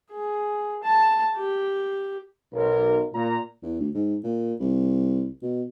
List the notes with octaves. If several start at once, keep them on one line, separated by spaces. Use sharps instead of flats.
G#4
A5
G4
B1 A#4
A#2 A#5
E2
D2
G#2
A#2
C2
B2